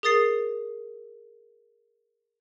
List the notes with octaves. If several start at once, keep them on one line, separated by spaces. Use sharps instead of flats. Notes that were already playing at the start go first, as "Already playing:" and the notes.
G#4 A#4 D#6 A6 C7